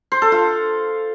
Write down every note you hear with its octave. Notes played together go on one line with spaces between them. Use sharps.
C5
A4
F4